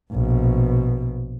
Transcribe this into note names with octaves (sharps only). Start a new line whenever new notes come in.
A#1 B2